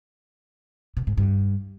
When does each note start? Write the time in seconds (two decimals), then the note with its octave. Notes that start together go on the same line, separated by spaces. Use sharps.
0.97 B2
1.07 G#2
1.17 G2